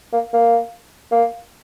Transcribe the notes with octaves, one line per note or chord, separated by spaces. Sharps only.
A#3
A#3
A#3